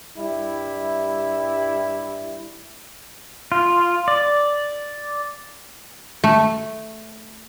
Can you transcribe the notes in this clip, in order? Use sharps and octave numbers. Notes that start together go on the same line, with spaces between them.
G2 G3 E4
F4
D5
A3